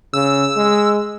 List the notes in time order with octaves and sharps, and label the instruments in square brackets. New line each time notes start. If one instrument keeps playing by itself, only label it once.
[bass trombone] C#3 [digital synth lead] E6
[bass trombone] G#3